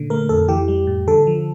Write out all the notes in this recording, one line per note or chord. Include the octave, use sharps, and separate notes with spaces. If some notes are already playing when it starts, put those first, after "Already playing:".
Already playing: A#2 D3
A3 A#4
F2 A4
E3 G4
G3
A2
D3 A4
F3